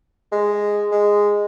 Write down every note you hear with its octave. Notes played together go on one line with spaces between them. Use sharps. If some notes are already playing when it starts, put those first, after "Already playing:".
G#3
G#3